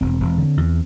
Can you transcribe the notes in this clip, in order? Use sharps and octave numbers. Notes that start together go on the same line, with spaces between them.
E1 C4
E1
D3
E2